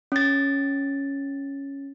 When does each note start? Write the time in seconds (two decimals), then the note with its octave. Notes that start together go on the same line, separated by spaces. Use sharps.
0.12 C#4 A6